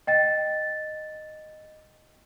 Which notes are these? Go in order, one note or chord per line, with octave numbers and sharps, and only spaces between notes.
D#5 G5 A6